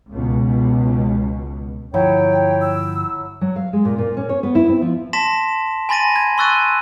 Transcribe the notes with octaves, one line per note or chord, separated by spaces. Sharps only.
C#2 B2
G1 F3 F#3 E4 C#5 G5
E6
F#3
F5
G#3
A#2
A#2
C#4
C#5
B3
E4
C4
F3
A5 C6 A#6 B6 E7
G#5 B5 C6 A6 A#6 D#7
G#6
C6 C#6 E6 F#6 A6 D#7